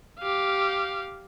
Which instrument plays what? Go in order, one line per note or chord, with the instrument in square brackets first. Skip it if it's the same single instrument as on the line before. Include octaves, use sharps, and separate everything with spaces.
[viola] G4 F5